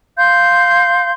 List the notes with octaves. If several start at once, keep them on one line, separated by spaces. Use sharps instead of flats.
F5 C6 G6